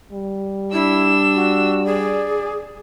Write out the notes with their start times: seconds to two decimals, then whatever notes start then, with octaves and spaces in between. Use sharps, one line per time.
0.13 G3
0.73 D4 E4 E6
1.35 F#4
1.85 G#4 D5